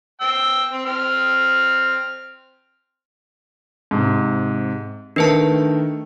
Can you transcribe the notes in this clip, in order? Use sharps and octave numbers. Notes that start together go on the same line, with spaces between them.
G5 E6
C4
C4 F6
G#2 C3
D#3 A3 D4 B4 A5